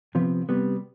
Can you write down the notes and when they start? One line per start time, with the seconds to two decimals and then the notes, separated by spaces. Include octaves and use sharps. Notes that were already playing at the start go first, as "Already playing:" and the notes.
0.15 C3 F3 B3 F4
0.49 C3 G3 B3